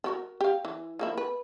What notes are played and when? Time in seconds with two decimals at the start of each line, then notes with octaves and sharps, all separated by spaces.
0.04 F3 F#4 A#4
0.41 G4 F5
0.65 E3
0.99 F3 A#3 E4
1.18 B4